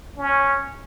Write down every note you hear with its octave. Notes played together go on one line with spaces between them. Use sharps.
C#4